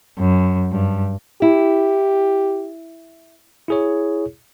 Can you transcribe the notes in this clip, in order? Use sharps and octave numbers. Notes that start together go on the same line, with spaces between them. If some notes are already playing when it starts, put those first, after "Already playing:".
F#2
G2
E4 G4
E4 G#4 C#5